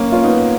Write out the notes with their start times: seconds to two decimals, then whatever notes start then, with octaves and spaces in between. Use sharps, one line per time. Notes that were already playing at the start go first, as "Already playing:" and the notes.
Already playing: A#3 C#4
0.12 C#4 F4
0.24 B3 D#4